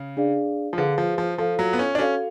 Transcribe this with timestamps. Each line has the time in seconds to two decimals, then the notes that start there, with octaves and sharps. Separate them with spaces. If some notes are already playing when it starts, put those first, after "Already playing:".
Already playing: C#3
0.17 D4 G#4 D5 F5
0.73 F3
0.78 D3 G#4 B4 F5
0.98 F3
1.18 F3
1.38 F3 F4 A4 F5
1.59 F#3
1.73 B3
1.79 C#4
1.95 D4
1.99 C#4 F#4 A4 F5